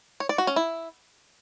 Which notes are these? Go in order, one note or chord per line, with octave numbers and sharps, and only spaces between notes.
C#5
D5
F#4
C#4
E4